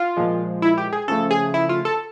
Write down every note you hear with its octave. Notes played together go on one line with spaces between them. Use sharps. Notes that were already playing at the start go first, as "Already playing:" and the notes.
Already playing: F4
A#2 F3 G#3
E4
G4
G#4
C#3 F3 A3 A4
G#4
E4
F4
A4